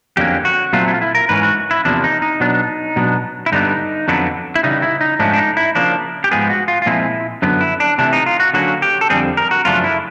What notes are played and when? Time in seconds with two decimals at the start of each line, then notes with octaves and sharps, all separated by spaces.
0.17 F2 D3 F#3 A#3 C#4 G4
0.45 F#4
0.73 A#2 F#3 A3 C4 F4
0.88 E4
0.94 F4
1.02 E4
1.15 A#4
1.29 G#2 E3 C#4 B4
1.43 F#4
1.71 E4
1.85 E2 C3 F3 A#3 D4
2.04 D#4
2.22 D#4
2.40 B2 F#3 B3 D4
2.96 B2 F#3 B3 D4
3.46 E4
3.52 G2 D3 G3 B3 D4 D#4
4.08 F2 D3 F#3 B3 D4
4.55 E4
4.63 C#3 E3 G3 D#4
4.82 E4
5.01 D#4
5.19 G#2 F3 A3 C#4 D4
5.33 D4
5.37 D#4
5.57 E4
5.75 C#3 F3 A#3 D4
6.24 G4
6.31 G#2 F3 G#3 B3 G#4
6.50 F#4
6.68 F4
6.82 F4
6.86 A#2 F3 G#3 C4 E4
7.42 F#2 D3 F#3 B3
7.61 E4
7.80 D4
7.98 C3 E3 A3 D4
8.13 D#4
8.26 F4
8.40 F#4
8.54 D3 F#3 A#3 C#4 F#4
8.82 G4
9.01 A4
9.10 F2 D3 G3 C4 G#4
9.37 A#4
9.51 F#4
9.65 F#2 C#3 F3 A3 D4 F4
9.84 E4